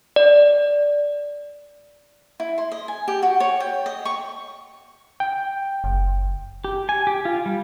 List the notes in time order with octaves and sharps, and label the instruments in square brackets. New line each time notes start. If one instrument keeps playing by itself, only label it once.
[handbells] D5
[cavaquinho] E4
C6
D#5
G#5
G4
F#4
C#5
G5
D#5
C#6
[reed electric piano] G5
[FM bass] F#1
[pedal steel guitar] G4
G#5
G4
F4
G3